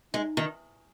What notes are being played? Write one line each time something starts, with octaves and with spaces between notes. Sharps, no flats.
G#3 D#4
D#3